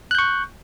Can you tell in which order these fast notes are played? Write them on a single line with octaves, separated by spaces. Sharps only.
F#6 G6 C#6